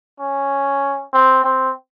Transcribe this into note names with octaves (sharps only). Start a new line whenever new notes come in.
C#4
C4
C4